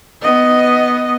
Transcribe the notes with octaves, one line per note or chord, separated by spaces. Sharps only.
B3 D#5